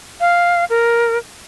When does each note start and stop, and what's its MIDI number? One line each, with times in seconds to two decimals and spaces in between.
0.20 0.65 77
0.70 1.18 70